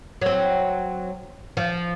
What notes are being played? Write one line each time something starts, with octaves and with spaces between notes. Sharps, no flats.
F#3 C4
F3